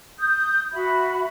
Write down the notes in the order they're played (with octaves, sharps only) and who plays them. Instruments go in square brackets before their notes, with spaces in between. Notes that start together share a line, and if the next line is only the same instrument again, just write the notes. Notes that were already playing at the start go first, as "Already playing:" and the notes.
[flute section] D#6 G6
F#4 E5 B5